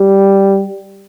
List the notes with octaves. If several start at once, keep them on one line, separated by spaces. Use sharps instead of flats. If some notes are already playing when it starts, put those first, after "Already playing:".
Already playing: G3